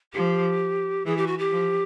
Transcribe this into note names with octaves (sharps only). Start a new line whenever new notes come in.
F3 G4
E3 G#4
G4
F#4
G4
F3